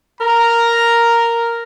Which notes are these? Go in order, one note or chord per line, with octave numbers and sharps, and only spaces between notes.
A#4 A#5